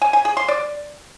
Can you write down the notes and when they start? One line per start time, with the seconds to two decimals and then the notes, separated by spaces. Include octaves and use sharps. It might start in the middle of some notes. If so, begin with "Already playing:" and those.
0.02 G#5
0.13 G#5
0.25 G#4
0.37 C6
0.48 D5